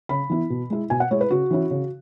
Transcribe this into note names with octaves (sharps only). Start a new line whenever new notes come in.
C#3 B5
E3 B3 E4
B2
G#3 E4
B2 G#5
F#5
G#3 E4 C#5
B4
C#3 F#4
E3 C#4 E4
C#3